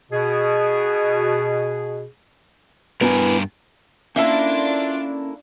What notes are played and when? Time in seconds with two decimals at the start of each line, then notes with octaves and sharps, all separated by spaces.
0.12 B2 G#4
3.01 G2 B3 E4 A#4 G#5
4.16 A#3 C#4 D4 E4 F4 A4 E5